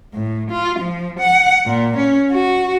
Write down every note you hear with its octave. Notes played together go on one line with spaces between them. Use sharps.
A2
F4
F3
F#5
A#2
C#4
F#4